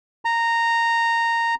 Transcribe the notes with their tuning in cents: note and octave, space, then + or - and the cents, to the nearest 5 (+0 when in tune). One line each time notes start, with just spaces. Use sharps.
A#5 -10